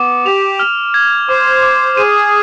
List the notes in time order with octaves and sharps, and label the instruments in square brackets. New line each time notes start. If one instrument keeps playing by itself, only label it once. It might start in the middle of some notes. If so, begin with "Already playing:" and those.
Already playing: [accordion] B3 [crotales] D6
[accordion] G4 [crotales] F7
[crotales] F6
G#6
[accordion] C5 [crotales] D6
[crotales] D6
[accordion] G#4 [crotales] D#7